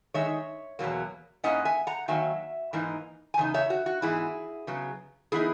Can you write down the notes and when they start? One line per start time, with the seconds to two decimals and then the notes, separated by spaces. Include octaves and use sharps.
0.14 D#3 G#3 D#4 C#5 E5
0.79 E2 B2 F#3 A#3
1.44 G#2 D#3 A#3 C#4 E4 D#5 F#5
1.65 E5 G#5
1.87 F#5 A#5
2.08 D#3 F#3 A#3 E5 G#5
2.73 G#2 E3 A#3 D#4
3.34 G#5
3.38 E2 C#3 D#4
3.54 C#5 E5
3.70 F#4
3.86 F#4
4.02 G#2 E3 B3 E4 G#4
4.67 C#3 F#3 B3
5.32 E3 B3 D#4 E4 G#4